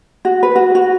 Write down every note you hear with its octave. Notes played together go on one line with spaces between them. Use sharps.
F#4
B4
F#4
F#4